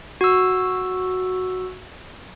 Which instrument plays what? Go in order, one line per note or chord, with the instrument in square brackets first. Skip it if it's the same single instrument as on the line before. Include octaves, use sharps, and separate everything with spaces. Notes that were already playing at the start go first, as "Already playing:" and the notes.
[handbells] F#4 E6